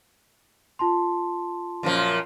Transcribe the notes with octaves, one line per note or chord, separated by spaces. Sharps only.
F4 A5 C6
F#2 A#2 F3